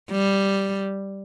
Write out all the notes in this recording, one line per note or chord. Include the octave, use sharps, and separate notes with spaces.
G3